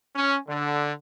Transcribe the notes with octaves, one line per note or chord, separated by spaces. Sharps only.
C#4
D3